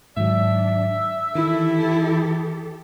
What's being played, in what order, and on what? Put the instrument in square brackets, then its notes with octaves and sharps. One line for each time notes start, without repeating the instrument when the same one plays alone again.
[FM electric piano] G#2 D#3 F#3 [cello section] D4 [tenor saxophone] E5
[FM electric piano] D#3 [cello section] E3 G4 A4 [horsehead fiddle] E4